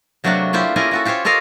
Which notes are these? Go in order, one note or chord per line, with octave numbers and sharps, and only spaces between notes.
C3 F#3 A3 A#3 D4 F#4
D4 E4 F4 G4 C5
C#4 E4 F4 A#4 G#5
E4 F#4 A4
F4 G4 A4 C5 C#5
F4 A4 A#4 D#5 F5